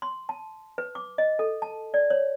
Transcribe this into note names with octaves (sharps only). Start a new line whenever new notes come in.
C6
A5
B4
D6
D#5
A4
A5
D5
C#5